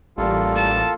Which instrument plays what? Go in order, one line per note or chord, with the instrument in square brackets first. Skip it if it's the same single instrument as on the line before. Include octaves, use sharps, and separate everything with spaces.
[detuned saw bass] A1 [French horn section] G3 [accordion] A#3 F4 A4
[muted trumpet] A5